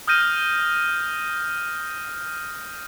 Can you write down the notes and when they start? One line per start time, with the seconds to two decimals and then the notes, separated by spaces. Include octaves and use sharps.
0.07 D#6 F6 G6 A#6 D#7